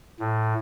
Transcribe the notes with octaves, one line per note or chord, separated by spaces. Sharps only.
A2